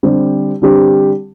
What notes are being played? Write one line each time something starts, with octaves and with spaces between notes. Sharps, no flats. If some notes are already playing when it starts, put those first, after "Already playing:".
D3 G3 C4 G4
D3 G3 C4 G4